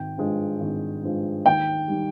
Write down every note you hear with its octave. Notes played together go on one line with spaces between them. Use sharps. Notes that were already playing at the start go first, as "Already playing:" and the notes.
Already playing: G#1 G5
G2 F3 G#3
G#1
G2 F3 G#3
D#2 G5
D#3 G3